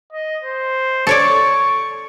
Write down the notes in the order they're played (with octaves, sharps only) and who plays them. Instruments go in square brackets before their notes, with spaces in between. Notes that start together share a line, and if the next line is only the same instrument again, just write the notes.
[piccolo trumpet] D#5
C5
[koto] A4 C#5 D5 [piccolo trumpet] C#6